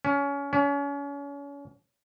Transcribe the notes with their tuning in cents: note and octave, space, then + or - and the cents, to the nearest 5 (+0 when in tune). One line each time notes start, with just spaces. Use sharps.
C#4 +25
C#4 +35